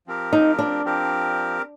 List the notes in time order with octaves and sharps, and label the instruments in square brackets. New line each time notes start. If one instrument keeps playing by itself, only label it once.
[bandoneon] F3 C4 G4 A#4
[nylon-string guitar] D#4
D4
[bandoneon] F3 C4 G4 A#4